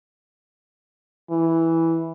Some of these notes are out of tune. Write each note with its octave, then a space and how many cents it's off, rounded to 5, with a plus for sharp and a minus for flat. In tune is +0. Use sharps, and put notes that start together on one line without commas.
E3 -5